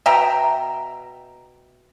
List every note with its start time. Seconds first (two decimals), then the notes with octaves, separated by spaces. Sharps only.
0.06 B2 E5 G5 A#5